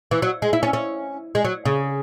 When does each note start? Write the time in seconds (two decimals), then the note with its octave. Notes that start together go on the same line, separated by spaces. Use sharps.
0.11 E3
0.22 F#3
0.42 G#3
0.53 E4
0.63 C#4
0.73 C#4
1.35 G#3
1.45 F#3
1.65 C#3